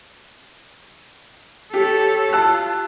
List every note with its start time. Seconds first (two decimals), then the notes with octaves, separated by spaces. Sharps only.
1.74 G4 A4 C#5
2.33 F4 A5 E6 F#6